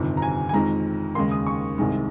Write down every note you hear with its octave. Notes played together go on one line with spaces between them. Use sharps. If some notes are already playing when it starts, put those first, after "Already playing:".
Already playing: G1 F2 C3 D#3
A#5
G#5
G#5
F2 D#3 G#3 A#5
D#2 C#3 G#3 C6
D#6
C#6
C2 C3 D#3 G#3